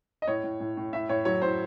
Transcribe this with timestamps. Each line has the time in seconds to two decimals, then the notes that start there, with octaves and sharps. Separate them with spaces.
0.22 D#5
0.27 A2 C#5
0.43 A2
0.60 A2
0.77 A2
0.93 A2 E5
1.09 A2 C#5
1.25 F#3 C#5
1.41 A2 C5